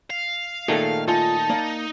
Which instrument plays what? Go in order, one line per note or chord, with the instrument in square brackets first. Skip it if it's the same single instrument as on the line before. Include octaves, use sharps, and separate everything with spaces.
[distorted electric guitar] F5
[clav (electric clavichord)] A#2 D#3 A3 [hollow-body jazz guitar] G#4 A4
[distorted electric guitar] D#4 [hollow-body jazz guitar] F4 D5 G#5 [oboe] A5
[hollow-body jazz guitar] A#3 D5